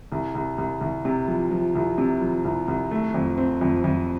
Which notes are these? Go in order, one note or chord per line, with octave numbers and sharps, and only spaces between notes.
C2
C2
C2
C2
C3
F3
F3
C2
C3
F3
C2
C2
A3
F2
C4
F2
F2